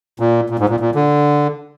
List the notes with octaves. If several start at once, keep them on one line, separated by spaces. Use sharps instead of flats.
A#2
A#2
G#2
A#2
A#2
D3